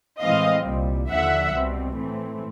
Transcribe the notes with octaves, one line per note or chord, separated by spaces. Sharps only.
A2 E3 G#3 C4 D#5 F5
C2 A#2 G3
D#2 D3 F3 E5 F#5
C2 B2 G3 C4
A2 E3 A3 C4